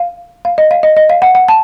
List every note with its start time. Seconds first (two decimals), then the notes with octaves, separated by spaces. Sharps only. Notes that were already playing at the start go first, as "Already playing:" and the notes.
Already playing: F5
0.45 F5
0.58 D#5
0.71 F5
0.83 D#5
0.97 D#5
1.10 F5
1.22 F#5
1.35 F#5
1.48 A5